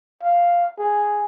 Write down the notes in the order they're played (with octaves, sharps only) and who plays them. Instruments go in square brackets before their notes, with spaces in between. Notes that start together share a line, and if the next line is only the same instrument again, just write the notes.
[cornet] F5
G#4